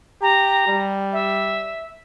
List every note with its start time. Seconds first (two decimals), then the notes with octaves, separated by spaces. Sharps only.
0.22 G4 A#5
0.68 G3
1.13 E5